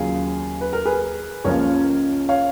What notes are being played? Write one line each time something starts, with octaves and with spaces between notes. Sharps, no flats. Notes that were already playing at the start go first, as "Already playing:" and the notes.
Already playing: D#2 C#3 F#3 F4 G#4
B4
A#4
G#4 B4
C#2 C#3 F3 A#3 C#4 A#4 C#5
C#5 F5